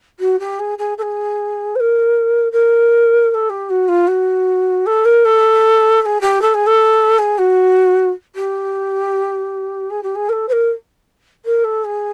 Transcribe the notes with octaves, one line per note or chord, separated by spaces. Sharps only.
F#4
G4
G#4
G#4
A4
G#4
C5
A#4
A#4
A#4
A4
G4
F#4
F4
F#4
A4
A#4
A4
A4
G#4
G4
A4
G#4
A4
G#4
F#4
G4
G#4
G4
G#4
A#4
A4
C5
A#4
A#4
A4
G#4